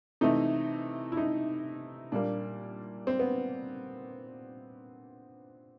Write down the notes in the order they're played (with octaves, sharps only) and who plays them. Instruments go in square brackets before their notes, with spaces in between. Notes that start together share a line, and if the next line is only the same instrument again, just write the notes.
[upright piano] C3 E3 A3 D#4
E4
D#4
A#2 G3 A#3 D4
C4
B3